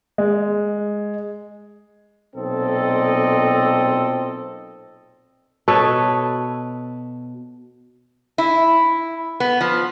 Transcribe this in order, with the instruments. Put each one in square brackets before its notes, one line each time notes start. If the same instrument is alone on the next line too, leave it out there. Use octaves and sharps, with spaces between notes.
[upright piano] G#3
[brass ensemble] B1 A#2 C4 A4 D#5
[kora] B2 A4 B4 C#5
[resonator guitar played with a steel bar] E4
B3
F3